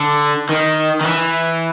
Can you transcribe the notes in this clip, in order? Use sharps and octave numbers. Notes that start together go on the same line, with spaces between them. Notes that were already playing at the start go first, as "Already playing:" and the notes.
Already playing: D3
D#3
D#3
E3